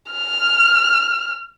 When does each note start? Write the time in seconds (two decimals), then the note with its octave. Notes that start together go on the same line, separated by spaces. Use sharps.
0.12 F6